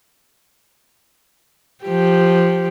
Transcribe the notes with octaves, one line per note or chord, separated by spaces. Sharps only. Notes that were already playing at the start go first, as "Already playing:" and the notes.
F3 G4